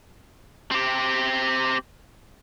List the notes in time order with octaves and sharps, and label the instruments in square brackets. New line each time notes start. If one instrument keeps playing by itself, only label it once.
[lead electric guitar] C4 G4